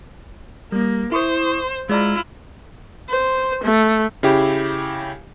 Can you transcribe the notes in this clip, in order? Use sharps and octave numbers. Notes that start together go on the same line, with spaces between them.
G3 A#3
E4 C5 C#6 D#6
G#3 E4 F4 D5 A#5
C5
A3
C#3 E4 G4